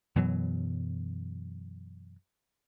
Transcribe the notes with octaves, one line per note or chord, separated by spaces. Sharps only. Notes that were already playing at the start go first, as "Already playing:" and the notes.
F#2 B2 E3 F#3